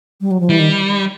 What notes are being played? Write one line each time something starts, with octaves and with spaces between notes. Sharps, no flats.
G3
F#3
F3
E3 G3
D#3